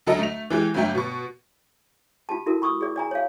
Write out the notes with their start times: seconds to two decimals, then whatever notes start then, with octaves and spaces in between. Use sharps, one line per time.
0.07 D2 F#3 A4 D#5 A#5
0.19 A3 F7
0.50 E3 G#3 G4
0.74 G1 G2 F#3 A3 G5
0.95 B2 C#6
2.29 F4 G4 A5
2.46 E4 F#4 A4 A#4
2.62 B5 C#6 D#6 E6
2.81 G#4 D5
2.96 D5 G#5 A#5
3.11 C#5 F5